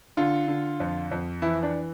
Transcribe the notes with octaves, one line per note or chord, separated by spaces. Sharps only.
D3 F4
D3
F2
F2
E3 E4
D4